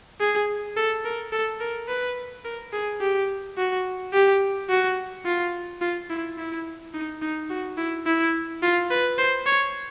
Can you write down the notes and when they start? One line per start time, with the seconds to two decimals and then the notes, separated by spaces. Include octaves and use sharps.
0.20 G#4
0.76 A4
1.05 A#4
1.32 A4
1.60 A#4
1.88 B4
2.45 A#4
2.73 G#4
3.01 G4
3.57 F#4
4.13 G4
4.69 F#4
5.25 F4
5.81 F4
6.10 E4
6.38 E4
6.94 D#4
7.22 D#4
7.50 F#4
7.78 E4
8.06 E4
8.62 F4
8.91 B4
9.18 C5
9.47 C#5